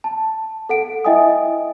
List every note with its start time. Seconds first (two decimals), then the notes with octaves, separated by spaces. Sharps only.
0.04 A5
0.69 A4 F#5 D7
1.05 E4 D#5 E5 G5 G#5 D#6